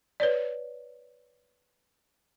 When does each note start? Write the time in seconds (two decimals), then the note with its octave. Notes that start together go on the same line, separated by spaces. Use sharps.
0.20 B4 C#5 D5